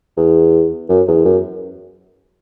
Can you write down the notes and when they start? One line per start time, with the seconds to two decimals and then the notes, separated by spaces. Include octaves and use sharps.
0.17 E2
0.89 F#2
1.08 E2
1.25 F#2